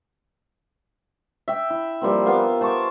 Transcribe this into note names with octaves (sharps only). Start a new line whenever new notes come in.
E5 G5
E4
F3 G3 A#3 C4
A#3 B3 F4 F5
C5 A5 C#6 D6